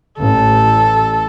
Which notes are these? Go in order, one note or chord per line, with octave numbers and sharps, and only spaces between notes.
A1 A4